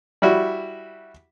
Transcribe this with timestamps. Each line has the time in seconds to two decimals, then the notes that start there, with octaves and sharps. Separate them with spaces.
0.22 G3 E4 F#4 E5